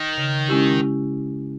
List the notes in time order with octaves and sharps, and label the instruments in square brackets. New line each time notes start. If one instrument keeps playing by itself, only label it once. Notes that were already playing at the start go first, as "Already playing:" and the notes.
Already playing: [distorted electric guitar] D#3
[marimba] C#3
G#3 C#4 E4 G4